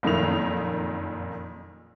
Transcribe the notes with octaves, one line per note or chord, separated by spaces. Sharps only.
F#1 F2 A#2 D#3 F7